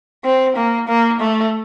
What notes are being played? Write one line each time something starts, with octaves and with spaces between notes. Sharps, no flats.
C4
A#3
A#3
A3